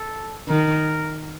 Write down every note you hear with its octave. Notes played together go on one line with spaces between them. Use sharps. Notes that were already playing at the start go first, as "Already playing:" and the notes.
Already playing: A4
D#3 A#4